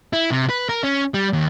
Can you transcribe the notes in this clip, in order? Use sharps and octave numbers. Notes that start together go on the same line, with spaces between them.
E4
C3
B4
A#4
C#4
G3
D#2